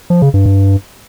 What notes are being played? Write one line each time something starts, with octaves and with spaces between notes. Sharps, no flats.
F3
C#3
G2
G2